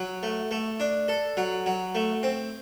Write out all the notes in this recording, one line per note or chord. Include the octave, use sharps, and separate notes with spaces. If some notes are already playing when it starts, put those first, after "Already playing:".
Already playing: F#3
A3
A3
D4
A4
F#3
F#3
A3
C4